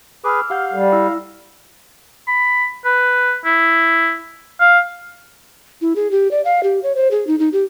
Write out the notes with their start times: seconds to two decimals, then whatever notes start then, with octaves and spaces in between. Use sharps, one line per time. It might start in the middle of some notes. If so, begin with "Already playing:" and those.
0.24 G#4 B4 D6 E6 F6
0.50 G4 F5 F#5 G6
0.74 G3 A4
0.92 E4 E6
2.28 B5
2.85 B4
3.45 E4
4.60 F5
5.81 E4
5.96 G#4
6.11 G4
6.31 D5
6.45 F5
6.63 G4
6.83 C#5
6.95 C5
7.11 G#4
7.27 D#4
7.39 D#4
7.53 G4